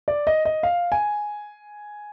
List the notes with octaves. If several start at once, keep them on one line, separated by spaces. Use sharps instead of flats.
D5
D#5
D#5
F5
G#5